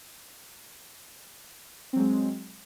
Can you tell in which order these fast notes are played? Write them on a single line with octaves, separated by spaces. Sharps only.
C4 F#3 G#3